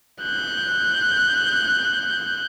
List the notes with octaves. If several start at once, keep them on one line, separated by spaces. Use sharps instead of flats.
F#6 G6